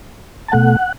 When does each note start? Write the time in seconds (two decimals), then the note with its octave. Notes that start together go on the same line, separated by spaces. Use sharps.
0.48 A5
0.52 B2 A3 F#5